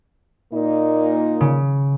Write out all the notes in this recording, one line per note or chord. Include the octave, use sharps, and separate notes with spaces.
A#2 A#3 D#4
C#3